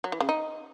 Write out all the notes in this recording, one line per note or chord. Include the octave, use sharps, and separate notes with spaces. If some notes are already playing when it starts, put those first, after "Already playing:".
F#3
E3
C#3
D#4